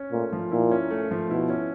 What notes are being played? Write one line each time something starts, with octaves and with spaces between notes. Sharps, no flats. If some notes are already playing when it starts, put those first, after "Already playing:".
Already playing: C#4
A#2 A3
F3
A#2 E4
C#4
A3
F3
B2 E4
C#4